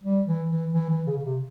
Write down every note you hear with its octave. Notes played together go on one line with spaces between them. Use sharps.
G3
E3
E3
E3
E3
C#3
C#3
C3